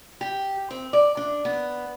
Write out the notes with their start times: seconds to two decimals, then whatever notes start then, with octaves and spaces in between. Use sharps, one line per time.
0.21 G4
0.70 C4
0.93 D5
1.17 D4
1.45 B3